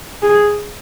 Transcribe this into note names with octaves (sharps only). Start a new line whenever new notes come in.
G#4